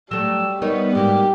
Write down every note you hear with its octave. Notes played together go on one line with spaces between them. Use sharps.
F#3 G3 A3 E6
G3 B3 D#4 A#4 C#5
G#2 A#3 F#4 G4